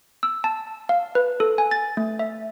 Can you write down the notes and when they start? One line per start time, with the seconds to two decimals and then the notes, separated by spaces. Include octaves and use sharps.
0.23 E6
0.44 A5
0.89 F5
1.15 B4
1.40 A4
1.58 G#5
1.71 A6
1.97 A3
2.19 E5